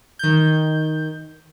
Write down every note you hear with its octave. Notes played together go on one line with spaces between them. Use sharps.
D#3 G6